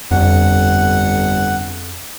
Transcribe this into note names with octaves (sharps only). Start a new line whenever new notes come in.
G1 F2 F#5